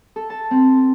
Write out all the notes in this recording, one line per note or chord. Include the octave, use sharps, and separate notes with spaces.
A4
A5
C4